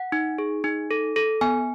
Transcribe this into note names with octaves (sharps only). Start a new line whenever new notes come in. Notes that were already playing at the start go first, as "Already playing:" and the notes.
Already playing: F#5
D#4
G#4
D#4
A4
A4
B3 G#5